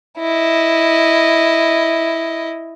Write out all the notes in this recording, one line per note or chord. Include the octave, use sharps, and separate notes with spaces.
E4 D#5